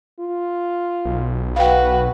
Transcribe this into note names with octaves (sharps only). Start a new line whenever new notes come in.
F4
B1
F#4 B4 F5 G5